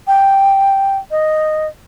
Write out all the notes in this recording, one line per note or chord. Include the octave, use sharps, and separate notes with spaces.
G5
D#5